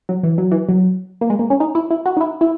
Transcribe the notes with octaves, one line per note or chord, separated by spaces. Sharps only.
F#3
E3
F#3
E3
F#3
A#3
G#3
A#3
C#4
D#4
E4
E4
F#4
D#4
E4
E4